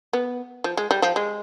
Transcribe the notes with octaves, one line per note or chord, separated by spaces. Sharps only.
B3
F3
G#3
G3
F3
G#3